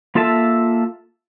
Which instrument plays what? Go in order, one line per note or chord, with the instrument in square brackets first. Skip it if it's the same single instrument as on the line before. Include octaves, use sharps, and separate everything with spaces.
[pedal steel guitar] A#3 F4 A4 E5 A5